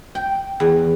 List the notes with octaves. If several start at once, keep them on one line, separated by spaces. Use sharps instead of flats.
G5
E2